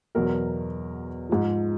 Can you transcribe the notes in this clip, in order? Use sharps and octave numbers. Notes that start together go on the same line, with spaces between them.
E2 B2 F#3 A#4
G#2 F3